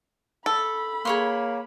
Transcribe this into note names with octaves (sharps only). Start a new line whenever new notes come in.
A4 B5
A#3 G#4 C#5 C6